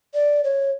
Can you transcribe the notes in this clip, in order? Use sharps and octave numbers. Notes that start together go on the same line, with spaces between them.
D5
C#5